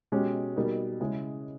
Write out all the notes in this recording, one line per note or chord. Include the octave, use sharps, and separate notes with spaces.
B2 G#3 C#4 G4
B2 G3 A#3 D#4 G#4
C#3 G#3 C#4 E4 G#4